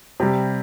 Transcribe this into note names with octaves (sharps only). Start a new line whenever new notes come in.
C3 G3